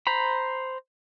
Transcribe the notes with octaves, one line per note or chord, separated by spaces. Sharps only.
C5 A#5 B5